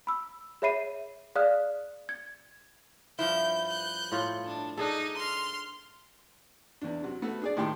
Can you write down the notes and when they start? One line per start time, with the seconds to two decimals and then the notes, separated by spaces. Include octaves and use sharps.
0.07 B5 E6
0.62 G#4 C#5 E5 B5 C7 D#7
1.35 G#4 D5 F5 D#6 F6 F#6
2.09 G#6
3.19 G2 F3 E4 G6
3.68 F#6 G6
4.12 A2 F4 C#5
4.45 D4
4.77 D4 D#4 G#4 A4
5.17 C6 F6
6.82 E2 D4
7.03 C3 F#3
7.22 A3 B3 F#4 A4 B4
7.42 D4 G#4 D5
7.57 A2 D#3 E4 G4 G5 C6